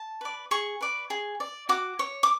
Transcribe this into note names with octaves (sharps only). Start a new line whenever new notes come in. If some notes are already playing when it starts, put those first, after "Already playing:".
Already playing: A5
B4 D5
G#4 C#6
B4 D5
G#4
D5
F#4 D6
C#5
D6